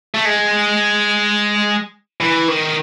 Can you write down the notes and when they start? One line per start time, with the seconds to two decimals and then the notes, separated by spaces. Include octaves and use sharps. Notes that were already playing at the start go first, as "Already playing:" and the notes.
0.14 A3
0.25 G#3
2.21 E3
2.48 D#3